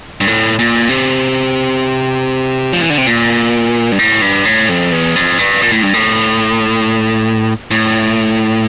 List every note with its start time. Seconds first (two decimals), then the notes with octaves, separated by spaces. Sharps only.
0.21 G2
0.27 A2
0.59 A#2
0.89 C3
2.73 F3
2.81 E3
2.90 D3
2.98 C3
3.07 A#2
3.92 G2
3.99 A2
4.22 G2
4.45 A2
4.69 F2
4.92 E2
5.16 F2
5.38 G2
5.62 A#2
5.72 A2
5.83 G2
5.94 A2
7.71 A2